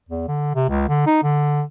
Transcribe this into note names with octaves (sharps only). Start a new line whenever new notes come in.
E2
D3
C3
C#2
D3
D#4
D3